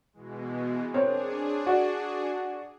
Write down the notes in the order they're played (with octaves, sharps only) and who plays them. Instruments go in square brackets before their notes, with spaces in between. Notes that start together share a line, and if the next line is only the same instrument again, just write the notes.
[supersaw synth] B2 E3 G#3
[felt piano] C4 A#4 C#5 [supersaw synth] D4 G#4
[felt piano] F#4 D5 F#5